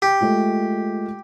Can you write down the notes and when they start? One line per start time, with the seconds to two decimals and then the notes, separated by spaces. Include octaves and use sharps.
0.02 G4
0.21 G#3 A3 F4